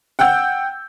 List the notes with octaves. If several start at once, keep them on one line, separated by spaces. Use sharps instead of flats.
F#5 G5 E6 G6